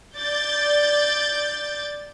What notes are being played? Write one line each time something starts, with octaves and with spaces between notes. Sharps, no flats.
D5 G6 A6